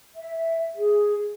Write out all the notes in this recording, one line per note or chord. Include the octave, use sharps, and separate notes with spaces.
E5
G#4